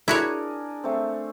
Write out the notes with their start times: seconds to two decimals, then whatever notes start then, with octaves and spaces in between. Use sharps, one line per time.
0.08 D4 E4 F#4 G#4 A#4 C#5
0.84 A3 C4